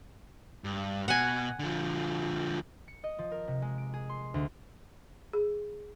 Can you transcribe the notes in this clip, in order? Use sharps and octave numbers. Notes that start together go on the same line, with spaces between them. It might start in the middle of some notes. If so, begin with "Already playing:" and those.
G2
B2 F#5 G#5
D3 F3
C#7
D#5
F3
A#4
C3
G#3
D7
G#4
C6
D2
G#4